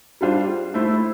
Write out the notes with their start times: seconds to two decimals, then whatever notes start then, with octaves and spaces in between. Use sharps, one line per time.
0.21 G3 D4 F4 C5
0.74 A3 E4 A4 C5